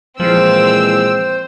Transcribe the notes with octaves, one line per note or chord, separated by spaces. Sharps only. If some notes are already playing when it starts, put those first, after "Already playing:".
A#2 E3 F3 G#3 C4 C5 E6